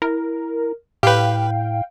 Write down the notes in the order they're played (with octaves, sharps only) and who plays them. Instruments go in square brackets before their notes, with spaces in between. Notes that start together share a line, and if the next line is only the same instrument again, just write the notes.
[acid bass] E4 [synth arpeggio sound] A#4
[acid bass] A2 [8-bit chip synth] G4 B4 [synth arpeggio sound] F5 G5